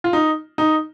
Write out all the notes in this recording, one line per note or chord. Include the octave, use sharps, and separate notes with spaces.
F4
D#4
D#4